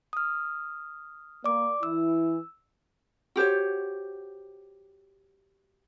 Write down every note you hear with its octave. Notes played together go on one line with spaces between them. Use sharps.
D#6 F6
A#3 D5 D6
E3 E4 E6
F#4 G4 C5 C#5